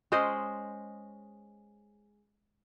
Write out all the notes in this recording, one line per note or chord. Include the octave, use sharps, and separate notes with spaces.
G#3 C#4 C5 D#5